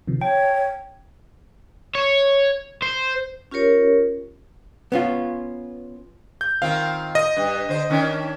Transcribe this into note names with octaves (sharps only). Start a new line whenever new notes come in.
C3 D#3 F3
C#5 G5 A5
C#5
C5
C#4 F4 G4 A#4 C#5
B3 C#4 F4
G6
D#3 C4 F4 F5
D#5
G2
D3 C5
D#3 C#4 D4